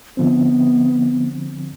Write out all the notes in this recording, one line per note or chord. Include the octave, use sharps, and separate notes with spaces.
D3 F3 B3 C4